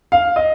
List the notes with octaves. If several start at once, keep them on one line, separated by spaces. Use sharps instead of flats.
F5
D#5